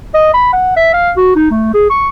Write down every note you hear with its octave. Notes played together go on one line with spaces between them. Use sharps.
D#5
B5
F#5
E5
F5
F#4
D#4
A3
G#4
C#6